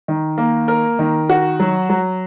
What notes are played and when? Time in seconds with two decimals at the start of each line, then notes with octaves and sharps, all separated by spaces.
0.08 D#3
0.38 A#3
0.68 A#4
0.99 D#3
1.30 F#4
1.60 F#3
1.90 F#3